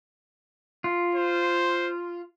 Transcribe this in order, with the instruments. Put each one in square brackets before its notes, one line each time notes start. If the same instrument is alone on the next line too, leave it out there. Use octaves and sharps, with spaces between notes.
[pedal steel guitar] F4
[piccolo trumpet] C5